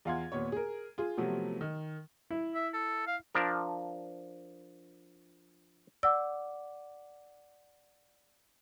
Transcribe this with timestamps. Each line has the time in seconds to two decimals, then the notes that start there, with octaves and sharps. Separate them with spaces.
0.05 E2 F4 F5 F#5 C6 G#6
0.32 D#2 A#2 B3 C#5
0.52 G#4 A#4
0.98 F4 G#4
1.17 C3 F3 F#3 A3 B3
1.61 D#3
2.31 E4
2.55 E5
2.74 A4
3.07 F5
3.35 F3 D4 A#4
6.03 D5 F#5 D6 E6